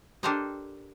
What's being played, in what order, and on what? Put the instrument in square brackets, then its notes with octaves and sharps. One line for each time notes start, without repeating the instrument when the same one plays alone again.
[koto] D4 G4 A4 A#4 C5 D#5